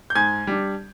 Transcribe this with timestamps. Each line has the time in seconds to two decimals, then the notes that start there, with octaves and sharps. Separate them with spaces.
0.10 G6
0.15 G#2 G#5 G#6
0.47 G3 D4